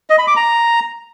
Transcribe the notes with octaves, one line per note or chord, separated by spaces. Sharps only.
D#5
B5
D6
A#5